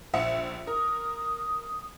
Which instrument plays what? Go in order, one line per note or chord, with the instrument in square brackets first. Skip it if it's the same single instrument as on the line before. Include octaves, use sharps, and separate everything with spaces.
[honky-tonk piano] A#1 E5 C#7
[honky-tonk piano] A#4 [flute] D#6